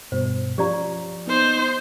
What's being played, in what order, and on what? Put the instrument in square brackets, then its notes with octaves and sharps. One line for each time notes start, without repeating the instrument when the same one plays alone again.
[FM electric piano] G2 B2 [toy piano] C5
[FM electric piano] F3 C#4 F4 [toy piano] G4 D5 A#5
[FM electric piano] B3 [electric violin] D#4 C5